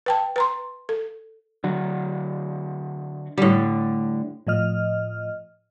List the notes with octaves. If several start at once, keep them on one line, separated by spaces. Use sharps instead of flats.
B4 G5 A5
B4 A#5 C6
A4
D3 F#3
A2 D3 G3
A2 F3 D#5 F6